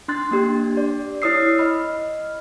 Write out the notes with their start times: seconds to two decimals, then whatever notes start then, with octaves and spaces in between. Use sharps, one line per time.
0.08 D4 C6 F#6 A6
0.31 A#3 D4 G4
0.77 D5
1.22 E4 C#5 D#6 E6 C7
1.58 D#5 B5 F6